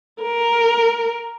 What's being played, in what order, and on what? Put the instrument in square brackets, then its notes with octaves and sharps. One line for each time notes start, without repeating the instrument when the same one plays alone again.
[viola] A#4